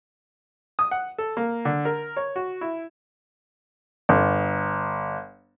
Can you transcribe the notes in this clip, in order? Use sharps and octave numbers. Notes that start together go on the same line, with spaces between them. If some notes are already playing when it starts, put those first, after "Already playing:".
D#6
F#5
A4
A#3
D3
A#4
C#5
F#4
E4
G1